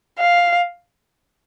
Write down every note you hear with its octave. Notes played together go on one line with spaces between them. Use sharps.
F5